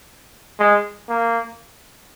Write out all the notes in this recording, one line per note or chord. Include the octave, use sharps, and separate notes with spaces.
G#3
A#3